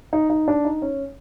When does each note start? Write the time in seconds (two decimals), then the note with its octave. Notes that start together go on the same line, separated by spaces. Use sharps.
0.13 D#4
0.30 D#4
0.48 D4
0.65 D#4
0.82 C#4